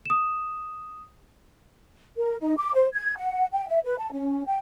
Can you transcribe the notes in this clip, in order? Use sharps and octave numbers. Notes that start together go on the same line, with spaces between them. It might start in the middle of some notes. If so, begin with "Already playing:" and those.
D#6 E7
A#4
D#4
D6
C5
G#6
F#5
G5
E5
B4
A5
C#4
G5